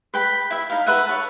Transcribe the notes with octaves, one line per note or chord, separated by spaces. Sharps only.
B4 G5 B5
E4 E5
D#4 F5
B4 E5 F#5
C#5 A5